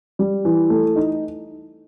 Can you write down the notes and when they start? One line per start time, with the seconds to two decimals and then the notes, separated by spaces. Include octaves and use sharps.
0.19 G3
0.45 E3
0.70 A3
0.96 D#4